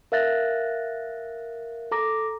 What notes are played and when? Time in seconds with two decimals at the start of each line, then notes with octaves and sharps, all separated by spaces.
0.12 A#4 E5 F5 F#6 A6 A#6
1.91 A4 A#5 D6 A#6